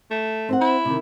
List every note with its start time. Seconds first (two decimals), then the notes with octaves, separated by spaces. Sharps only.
0.11 A3
0.49 C4 C5 F#5
0.61 E4
0.85 C3 D#3